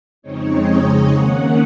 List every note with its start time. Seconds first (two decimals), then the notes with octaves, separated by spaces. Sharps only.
0.22 F2 C#3 G#3 C4 D#4 C#5
0.66 D#5
1.10 D#3 A#3 C#4 F#5